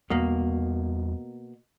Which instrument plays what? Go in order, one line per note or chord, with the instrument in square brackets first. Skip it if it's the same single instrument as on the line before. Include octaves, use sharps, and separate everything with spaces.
[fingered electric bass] E2 G3 [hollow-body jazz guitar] B2 A#3